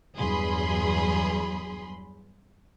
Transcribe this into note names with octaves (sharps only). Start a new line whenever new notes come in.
E2 G2 F#3 G#4 B5 C6